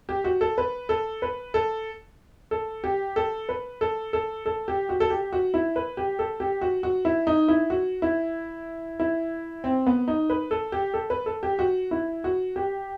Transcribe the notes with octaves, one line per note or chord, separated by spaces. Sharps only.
G4
F#4
A4
B4
A4
B4
A4
A4
G4
A4
B4
A4
A4
A4
G4
F#4
A4
G4
F#4
E4
B4
G4
A4
G4
F#4
F#4
E4
D#4
E4
F#4
E4
E4
C4
B3
D#4
B4
A4
G4
A4
B4
A4
G4
F#4
E4
F#4
G4